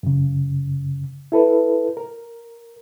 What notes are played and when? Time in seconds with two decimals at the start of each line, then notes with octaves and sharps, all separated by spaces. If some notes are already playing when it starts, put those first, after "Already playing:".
0.03 F#2 C#3
1.32 E4 A4 B4
1.97 A#4